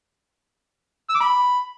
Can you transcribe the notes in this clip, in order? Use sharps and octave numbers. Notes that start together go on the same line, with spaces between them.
E6
D6
B5